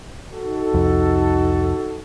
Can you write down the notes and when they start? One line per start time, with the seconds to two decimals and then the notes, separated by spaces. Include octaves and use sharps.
0.32 D#4 F#4 A4
0.74 C2 F2